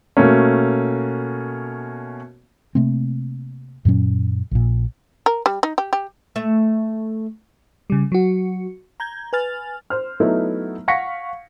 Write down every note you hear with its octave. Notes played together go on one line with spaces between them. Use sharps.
B2 A3 A#3 C#4
C3 A3 A#3 C4
F#2 A#2 F#3 C#4
A#1 A#2
A#4
G3
D#4
G4
G4
A3 E5
C#3 G3
F#3 F#4
A#5 G6 G#6
B4 G#5 F6 A6
C5 F6
F#3 A3 B3 D#4 E4
F5 F#5 C#6 A#6 B6 C#7